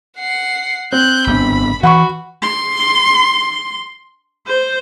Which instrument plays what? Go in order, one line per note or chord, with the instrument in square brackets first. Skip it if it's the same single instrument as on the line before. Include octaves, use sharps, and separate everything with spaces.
[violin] F#5 C7
[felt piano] C4 [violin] F#6 G6
[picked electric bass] G#1 B3 D4 [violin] B5
[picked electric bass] E3 [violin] F#4 [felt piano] F#5 B5 C#6
[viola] C6
C5